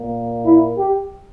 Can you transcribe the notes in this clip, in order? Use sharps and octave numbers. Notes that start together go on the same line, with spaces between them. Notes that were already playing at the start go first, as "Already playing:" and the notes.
Already playing: A#2 A#3
E4
G4